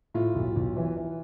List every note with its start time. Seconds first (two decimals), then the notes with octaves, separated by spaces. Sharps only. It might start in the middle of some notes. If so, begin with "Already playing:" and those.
0.14 A2 F4
0.35 B1
0.56 B1
0.77 E3
0.97 E3